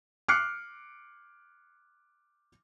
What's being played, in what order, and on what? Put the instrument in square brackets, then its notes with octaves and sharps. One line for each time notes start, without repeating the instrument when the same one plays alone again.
[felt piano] D6 F6 F#6 C7 C#7